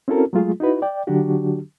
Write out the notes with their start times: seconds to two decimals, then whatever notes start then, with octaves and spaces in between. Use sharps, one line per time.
0.08 C4 C#4 E4 F#4 A4 A#4
0.33 F#3 G#3 A3 F4 G#4
0.60 D#4 E4 F#4 B4
0.82 D5 G5
1.07 D3 F#3 D4 F#4 G4